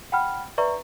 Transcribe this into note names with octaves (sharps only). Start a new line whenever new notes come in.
F#5 G5 B5 F6
B4 D5 E5 A#5 C#6